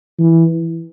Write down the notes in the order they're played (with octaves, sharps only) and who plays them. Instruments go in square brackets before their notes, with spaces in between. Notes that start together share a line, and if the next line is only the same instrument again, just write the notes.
[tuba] E3